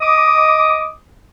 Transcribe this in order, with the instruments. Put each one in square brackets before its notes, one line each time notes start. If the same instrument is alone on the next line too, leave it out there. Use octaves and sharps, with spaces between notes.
[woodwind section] D#5 D6 D#6